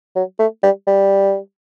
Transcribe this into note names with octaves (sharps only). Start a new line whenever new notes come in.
F#3
A3
G3
G3